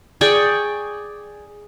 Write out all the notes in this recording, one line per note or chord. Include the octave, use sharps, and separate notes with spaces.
G#4 D5 G5 C#6